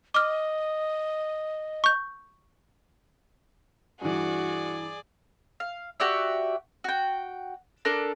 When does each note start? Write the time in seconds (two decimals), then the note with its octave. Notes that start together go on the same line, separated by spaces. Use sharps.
0.14 D#5 D6 F6
1.84 C#6 G6
4.01 G2 E3 F#4 G#4 D5
5.60 F5
6.00 F#4 G4 D5 E5
6.84 F#4 G5
7.85 D4 A4 A#4